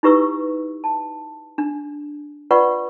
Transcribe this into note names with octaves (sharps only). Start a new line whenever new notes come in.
D#4 E4 G4 B4 C#6 E6
A5
D4
F4 B4 D5 F#5 C#6